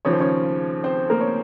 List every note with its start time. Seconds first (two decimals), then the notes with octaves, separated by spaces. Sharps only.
0.05 D#2 C#3 F3 C#5
0.13 C5
0.20 C#4 C#5
0.84 C4 C5
1.10 A#3 A#4
1.21 C#5